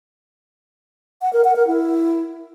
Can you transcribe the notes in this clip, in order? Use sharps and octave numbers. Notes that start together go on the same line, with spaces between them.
F#5
A#4
F#5
A#4
E4